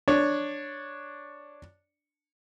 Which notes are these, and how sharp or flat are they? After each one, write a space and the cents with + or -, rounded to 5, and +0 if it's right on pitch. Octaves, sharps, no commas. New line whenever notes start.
D4 +0 C#5 +0